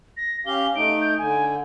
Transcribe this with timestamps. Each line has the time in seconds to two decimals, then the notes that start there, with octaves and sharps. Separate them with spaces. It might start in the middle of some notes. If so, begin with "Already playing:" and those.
0.17 A#6
0.46 C#4 G4 F5 G7
0.76 A3 D#4 D7
1.01 G6
1.18 D3 G#5